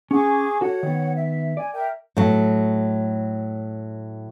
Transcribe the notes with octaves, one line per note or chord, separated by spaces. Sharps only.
C#4 G#4 F#5 C#6 D6
F#4 A4 C#5 F#5
D#3 B3
E5
D5 G#5
A#4 E5 G5
A2 F#3